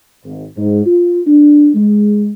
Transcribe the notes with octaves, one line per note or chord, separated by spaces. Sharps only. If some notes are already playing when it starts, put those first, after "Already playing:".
G#1
G#2
F4
D4
G#3